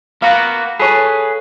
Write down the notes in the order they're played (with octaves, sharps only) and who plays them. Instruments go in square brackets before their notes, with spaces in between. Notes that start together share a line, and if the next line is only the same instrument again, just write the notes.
[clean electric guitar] A#3 B3 F#4 [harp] F5
[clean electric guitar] G#4 B4 [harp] A4 C#5